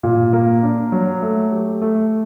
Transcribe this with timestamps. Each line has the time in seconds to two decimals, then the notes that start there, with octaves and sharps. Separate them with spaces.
0.03 A#2
0.33 A#3
0.63 D4
0.92 F#3
1.22 A3
1.52 G4
1.82 A3